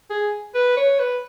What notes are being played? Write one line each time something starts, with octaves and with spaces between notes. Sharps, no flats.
G#4
B4
C#5
B4